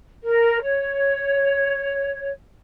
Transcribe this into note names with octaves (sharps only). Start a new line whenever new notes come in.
A#4
C#5